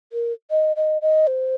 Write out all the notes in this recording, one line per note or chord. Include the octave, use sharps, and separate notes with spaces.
A#4
D#5
D#5
D#5
C5